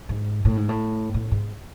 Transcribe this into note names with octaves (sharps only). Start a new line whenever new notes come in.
G#2
A2
G#2
A2
A2
G#2